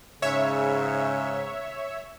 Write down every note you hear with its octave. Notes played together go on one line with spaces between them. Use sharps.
G#2 C#3 C#5 E5